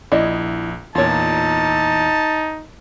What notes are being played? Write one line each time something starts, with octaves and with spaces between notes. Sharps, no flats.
A#1 E4 D5 D#5
E2 A#2 D#4 F4 C#5 A5